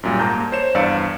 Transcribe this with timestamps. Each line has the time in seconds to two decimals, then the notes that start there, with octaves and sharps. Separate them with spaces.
0.03 F#2 A#2 G3
0.20 G#2 A#3 A5 A#5 G6
0.52 C5 C#5 E7
0.75 E2 G2 D5 F5 E6 C#7